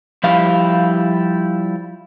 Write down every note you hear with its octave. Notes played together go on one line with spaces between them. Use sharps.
F3 G3 E4 F5